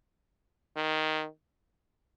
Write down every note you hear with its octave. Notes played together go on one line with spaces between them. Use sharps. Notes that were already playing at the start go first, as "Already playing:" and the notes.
D#3